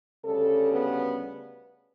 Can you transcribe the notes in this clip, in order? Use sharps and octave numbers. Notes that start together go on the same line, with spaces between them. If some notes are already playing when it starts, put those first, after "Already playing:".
D2 C#3 G3 A4
B3